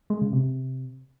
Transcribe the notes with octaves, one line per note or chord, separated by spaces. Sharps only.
G#3
C#3
C3